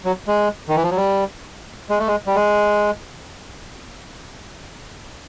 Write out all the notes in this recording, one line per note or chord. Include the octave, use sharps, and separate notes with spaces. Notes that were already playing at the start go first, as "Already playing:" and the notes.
F#3
G#3
D#3
E3
F3
F#3
G3
G#3
A3
G#3
G3
G#3